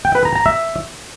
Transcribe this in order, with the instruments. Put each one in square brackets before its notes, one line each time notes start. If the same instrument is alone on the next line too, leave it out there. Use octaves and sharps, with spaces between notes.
[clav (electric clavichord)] G5
B4
A#5
A#5
E5